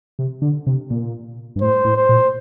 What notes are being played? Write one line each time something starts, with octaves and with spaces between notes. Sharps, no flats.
C3
D3
C3
A#2
G2
A2 C5
A2
C5
A#2